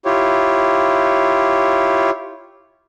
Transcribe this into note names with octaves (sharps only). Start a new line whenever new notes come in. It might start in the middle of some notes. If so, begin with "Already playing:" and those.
E4 F4 G4 C#5